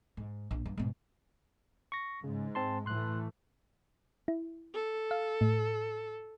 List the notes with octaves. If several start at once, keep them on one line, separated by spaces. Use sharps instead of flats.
G#2
A#1
G2
G#2 B2
C#6 A#6
G#2 C#3 G#3
C4 A5 C6
A2 E3 A3 C6 F#6
E4
A4
F5
A2